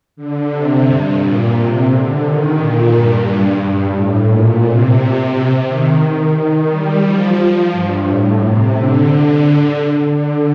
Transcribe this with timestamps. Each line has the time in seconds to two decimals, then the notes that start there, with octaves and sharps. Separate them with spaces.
0.16 D3
0.50 C3
0.85 G2
1.19 A#2
1.54 C3
1.89 D3
2.22 D#3
2.57 A#2
2.91 G2
3.25 G2
3.60 G2
3.94 A2
4.29 A#2
4.64 C3
5.66 D#3
6.70 G3
7.04 F3
7.39 F3
7.72 G2
8.07 A2
8.41 C3
8.76 D3
9.10 D3
10.13 D3